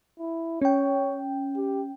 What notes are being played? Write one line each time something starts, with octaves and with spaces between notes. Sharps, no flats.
E4
C#4 C#5 G5
G4